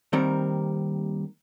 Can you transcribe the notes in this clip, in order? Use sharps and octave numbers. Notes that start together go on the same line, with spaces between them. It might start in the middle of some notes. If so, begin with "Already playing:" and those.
D#2 D#3 G3 C4 A#4